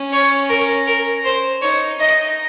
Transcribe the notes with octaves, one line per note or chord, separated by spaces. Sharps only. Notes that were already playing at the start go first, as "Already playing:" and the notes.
Already playing: C#4
C#5
A#4
A#4
C5
D#4 C#5
D#4 D#5